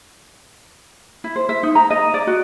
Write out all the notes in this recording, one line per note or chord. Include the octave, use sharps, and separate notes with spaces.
E4
C5
E5
D#4
A#5
D#5
D5
F#4